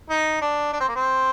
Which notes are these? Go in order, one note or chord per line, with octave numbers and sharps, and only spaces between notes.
D#4
D4
D4
C4
A#3
C4